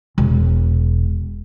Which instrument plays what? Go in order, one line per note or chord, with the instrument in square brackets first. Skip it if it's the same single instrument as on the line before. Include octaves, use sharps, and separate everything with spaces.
[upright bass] E1